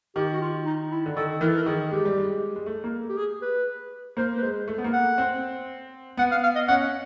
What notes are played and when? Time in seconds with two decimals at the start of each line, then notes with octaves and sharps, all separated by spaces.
0.16 D#3 G4
0.33 F#4
0.41 F4
0.65 D#4
0.91 E4
1.06 D3
1.16 D#3 A4
1.41 E3 A#4
1.48 A4
1.55 A#4
1.66 D#3 G#4
1.91 G#3 G4
2.05 G3
2.18 G#3
2.56 G#3
2.66 A3
2.84 A#3
3.09 G4
3.17 G#4
3.42 B4
4.17 A#3 C5
4.38 B4
4.42 G#3 C5
4.68 A3
4.78 B3
4.84 A#3
4.93 F#5
5.18 C4
6.17 B3 F#5
6.31 F5
6.43 F5
6.55 D#5
6.68 C#4 F#5